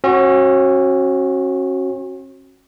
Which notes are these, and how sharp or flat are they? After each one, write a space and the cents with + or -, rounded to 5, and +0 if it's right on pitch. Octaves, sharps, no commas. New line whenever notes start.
C#4 -40 F#4 +0